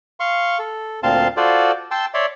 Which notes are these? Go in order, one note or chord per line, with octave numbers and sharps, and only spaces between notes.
F5 C6 C#6
A4
D2 A#2 C4 F5 A5 C6
F4 F#4 A4 C5 D5
G5 A5 C6 E6
C#5 D5 E5 C6